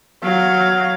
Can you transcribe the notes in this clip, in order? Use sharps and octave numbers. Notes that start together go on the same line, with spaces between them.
F#3 F5